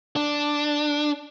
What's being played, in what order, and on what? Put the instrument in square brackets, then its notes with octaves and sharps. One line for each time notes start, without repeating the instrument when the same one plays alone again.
[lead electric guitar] D4